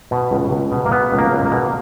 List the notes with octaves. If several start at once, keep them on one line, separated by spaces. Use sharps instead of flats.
B2
C#2
C#2
B2
A#3
B2 B3
C#2
A#3
C#2
A#3
B2